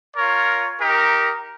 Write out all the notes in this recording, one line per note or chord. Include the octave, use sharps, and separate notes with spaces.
F4 A#4 C#5
D#4 G4 A#4